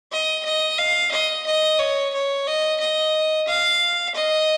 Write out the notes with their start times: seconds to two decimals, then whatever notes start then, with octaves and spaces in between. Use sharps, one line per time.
0.12 D#5
0.45 D#5
0.78 F5
1.12 D#5
1.46 D#5
1.79 C#5
2.14 C#5
2.47 D#5
2.80 D#5
3.48 F5
4.15 D#5